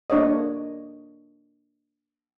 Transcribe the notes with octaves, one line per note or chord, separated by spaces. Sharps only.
A#3 D4 C#5 D#5